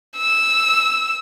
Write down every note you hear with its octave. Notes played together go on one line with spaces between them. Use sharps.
E6